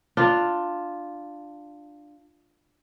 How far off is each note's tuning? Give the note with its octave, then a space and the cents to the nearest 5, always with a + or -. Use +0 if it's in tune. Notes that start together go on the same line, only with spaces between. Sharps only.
D4 +15 F4 +0